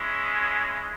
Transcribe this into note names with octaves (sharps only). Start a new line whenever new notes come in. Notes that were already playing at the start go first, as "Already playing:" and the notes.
Already playing: G#3 C#4 E4